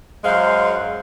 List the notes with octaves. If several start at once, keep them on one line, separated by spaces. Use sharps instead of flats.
F#2 G#3 C5 F5